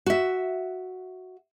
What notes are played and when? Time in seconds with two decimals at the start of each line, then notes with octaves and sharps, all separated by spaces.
0.06 F#4 E5